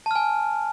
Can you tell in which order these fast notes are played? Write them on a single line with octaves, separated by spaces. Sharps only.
A5 F6 G#5